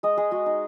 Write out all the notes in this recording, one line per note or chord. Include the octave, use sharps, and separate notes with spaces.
G#3 D#5
G#3 G#4
G#3 F#4
D#4